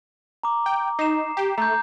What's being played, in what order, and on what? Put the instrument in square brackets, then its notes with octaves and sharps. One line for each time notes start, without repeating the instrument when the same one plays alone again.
[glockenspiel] A#5 D6
[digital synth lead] G5
[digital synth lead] D#4 [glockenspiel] C7 E7
[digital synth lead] G4
[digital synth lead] A3 [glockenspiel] A#5 G6